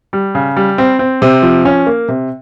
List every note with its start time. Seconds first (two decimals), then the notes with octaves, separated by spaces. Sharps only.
0.13 G3
0.35 C#3
0.57 G3
0.78 C4
0.99 C4
1.22 C3
1.42 F3
1.65 C#4
1.87 A#3
2.08 C3